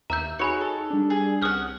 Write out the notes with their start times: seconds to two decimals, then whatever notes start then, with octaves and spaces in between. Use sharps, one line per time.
0.10 D#2 E5 A#5 E6 G6
0.39 D#4 F#4 G#4 C#5 G#5 B5 C#7
0.61 A4
0.90 G3 D4
1.10 G#4
1.42 C2 C#4 F#5 D#6 F6 G6